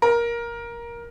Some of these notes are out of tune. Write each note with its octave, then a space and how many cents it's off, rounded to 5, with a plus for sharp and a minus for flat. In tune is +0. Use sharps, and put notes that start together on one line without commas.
A#4 +15